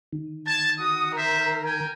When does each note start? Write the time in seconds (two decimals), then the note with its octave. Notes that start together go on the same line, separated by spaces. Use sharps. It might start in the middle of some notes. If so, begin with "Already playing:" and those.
0.13 D#3
0.47 A5 G#6
0.79 F#4 D#6
1.16 A#4 C5 E5
1.64 G5 G#5